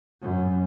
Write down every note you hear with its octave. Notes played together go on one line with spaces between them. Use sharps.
F#2